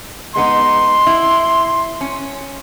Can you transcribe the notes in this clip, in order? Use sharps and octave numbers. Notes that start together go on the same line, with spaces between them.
G#3 B3 D#4 C6
E4
C#4